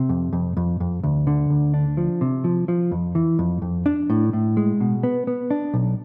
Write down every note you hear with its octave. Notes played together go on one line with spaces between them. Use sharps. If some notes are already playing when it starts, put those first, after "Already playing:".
Already playing: C3
F2
F2
F2
F2
D2
D3
D2
D4
F3
C3
F3
F3
F2
E3
F2
F2
D4
A2
A2
G#3
B2
B3
B3
D4
B1